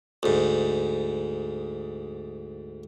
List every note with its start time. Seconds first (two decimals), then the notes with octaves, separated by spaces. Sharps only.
0.23 D2 G#2